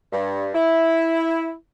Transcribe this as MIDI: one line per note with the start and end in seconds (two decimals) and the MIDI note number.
0.12 0.49 43
0.54 1.53 64